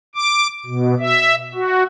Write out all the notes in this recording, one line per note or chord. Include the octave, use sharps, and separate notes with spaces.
D6
B2
E5
F#4